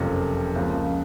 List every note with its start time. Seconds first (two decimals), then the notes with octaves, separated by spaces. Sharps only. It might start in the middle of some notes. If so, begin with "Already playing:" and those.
Already playing: F#1 F2 C3 F3
0.56 C#2 C#3 F3 A#3